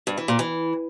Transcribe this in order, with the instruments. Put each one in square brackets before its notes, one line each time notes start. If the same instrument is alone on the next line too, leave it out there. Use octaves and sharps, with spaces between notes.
[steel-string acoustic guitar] G2
E3
A#2
E3